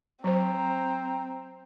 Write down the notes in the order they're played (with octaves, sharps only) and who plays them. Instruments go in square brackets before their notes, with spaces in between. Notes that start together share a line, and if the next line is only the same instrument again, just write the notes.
[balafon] F#3 C5 [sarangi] C4 [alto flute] A#5